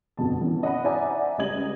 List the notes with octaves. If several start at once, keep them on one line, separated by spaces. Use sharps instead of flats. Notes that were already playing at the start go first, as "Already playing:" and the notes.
G1 F2 B2 A5
E3 B3 C#4
D#5 F#5 B5
C5 D5 E5 F#5 G#5 A#5
C#2 G3 D#5 G#6 F#7